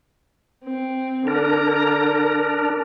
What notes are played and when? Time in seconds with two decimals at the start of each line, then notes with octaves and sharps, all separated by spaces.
0.64 C4
1.27 D3 D4 A#4 A#5